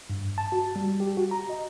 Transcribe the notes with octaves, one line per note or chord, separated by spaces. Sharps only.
G2
A5
F#4
G3
G4
F#4
A#5
D#5